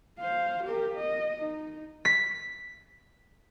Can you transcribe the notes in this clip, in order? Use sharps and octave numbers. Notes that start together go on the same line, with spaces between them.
C5 F5
G4 A#4
D#5
D#4
B6